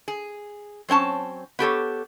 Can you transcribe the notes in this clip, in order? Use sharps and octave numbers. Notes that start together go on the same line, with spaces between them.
G#4
F#3 C4 C#4 A5
B3 G4 A4 C#5